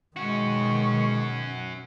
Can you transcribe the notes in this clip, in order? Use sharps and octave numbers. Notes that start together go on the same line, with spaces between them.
B2 D#3 G#3 C#4 F#4 C#6